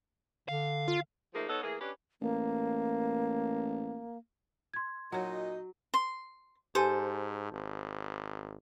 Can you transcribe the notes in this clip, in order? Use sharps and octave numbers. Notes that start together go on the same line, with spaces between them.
D3 F5
F4
F3 A3 A#3 D#4 G#4
B3 D#4 A4 B4 C#5
E3 A3 A#3 G#4
C#4 D4 G4 B4
A1 A#3
C6 G#6
A#2 F#3 D#4 C#5 D#5 F#5
C6 G7
G#2 G4 A4 C5 G#5
G#1